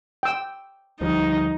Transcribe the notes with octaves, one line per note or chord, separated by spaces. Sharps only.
G5 E6
D2 F3 G3 D#4